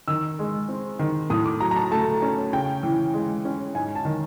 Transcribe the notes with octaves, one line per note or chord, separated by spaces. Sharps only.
D#3 E6
G#3
C4
D#3
A2 D#6
D6
F#3 A#5
A#5
A5
A3 A5
C#4
C#3 G5
E3
G#3
C#4
G#2 G#5
A5
D#3